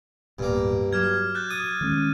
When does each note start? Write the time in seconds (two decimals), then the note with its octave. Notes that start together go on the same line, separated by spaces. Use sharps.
0.39 D1 G2 B2 A#3
0.93 F#3 D6 F6 G#6
1.35 F#6 G6 A6
1.50 D#6 D#7
1.81 D#3 G#3 C#4